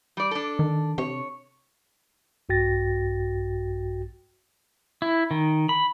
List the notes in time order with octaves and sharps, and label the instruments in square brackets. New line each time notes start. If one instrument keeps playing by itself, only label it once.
[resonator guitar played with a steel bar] G3 D5
D4 A4
[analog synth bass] D#3
[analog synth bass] C3 [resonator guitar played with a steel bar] C#5
[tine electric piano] A#1 G2 F#4 G5 A6 A#6
[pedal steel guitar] E4
D#3
B5